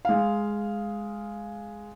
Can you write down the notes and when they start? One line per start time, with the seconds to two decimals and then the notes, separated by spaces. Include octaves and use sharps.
0.05 G#3 F5